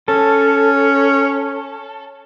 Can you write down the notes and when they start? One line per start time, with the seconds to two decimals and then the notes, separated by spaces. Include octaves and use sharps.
0.08 C#4 A4